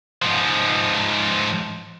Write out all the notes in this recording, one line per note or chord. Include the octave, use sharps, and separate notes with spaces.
G#2 F3